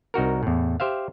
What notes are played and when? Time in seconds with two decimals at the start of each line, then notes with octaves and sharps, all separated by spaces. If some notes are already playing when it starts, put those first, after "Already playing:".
0.14 C2 D#4 F#4 A#4
0.43 E2 A2
0.80 G4 C5 E5 F5